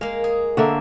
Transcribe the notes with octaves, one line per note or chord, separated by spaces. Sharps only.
G#3 A#3 F5
G#4
D3 A#3 C#5 E5